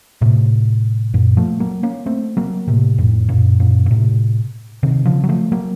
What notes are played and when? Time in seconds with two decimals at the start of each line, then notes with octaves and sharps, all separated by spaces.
0.21 A2 C3
1.14 F#2 A#2
1.37 F3 A3
1.60 F#3 A#3
1.83 A#3 C#4
2.06 A3 C4
2.37 F#3 A#3
2.67 A2 C3
2.98 F2 A2
3.28 F#2 A#2
3.60 F#2 A#2
3.86 A#2
3.90 A2 C3
4.83 C3 D#3
5.05 C#3 F3
5.24 F#3
5.29 F3 A3
5.52 F#3 A#3